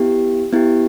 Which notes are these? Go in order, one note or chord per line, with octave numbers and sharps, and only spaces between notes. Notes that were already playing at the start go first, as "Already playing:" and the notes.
Already playing: B3 E4 G4
B3 E4 G4